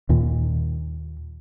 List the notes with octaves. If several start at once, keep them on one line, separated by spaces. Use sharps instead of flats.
D#2 A#2